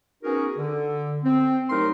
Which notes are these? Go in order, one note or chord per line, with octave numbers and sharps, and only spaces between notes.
B3 C#4 D#4 F#4 G#4 A#4
D3
C4
C2 F#3 A3 D#4 A#4 C6